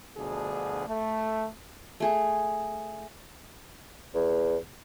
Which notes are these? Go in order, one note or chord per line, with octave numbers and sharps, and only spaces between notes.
D2 B2 F3 D4 G#4
A3
A3 G#4
E2